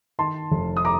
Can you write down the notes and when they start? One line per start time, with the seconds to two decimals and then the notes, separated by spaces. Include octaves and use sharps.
0.19 D#3 A5 C6
0.51 F1
0.77 D#6
0.85 A#5 D6